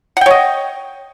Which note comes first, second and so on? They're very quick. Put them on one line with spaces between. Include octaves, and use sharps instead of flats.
F#5 G5 C#5 D#5